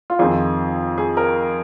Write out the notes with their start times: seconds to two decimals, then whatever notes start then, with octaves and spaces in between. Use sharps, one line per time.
0.10 F4
0.19 F2 D#3 C4 G#4
0.98 G#4
1.17 A#4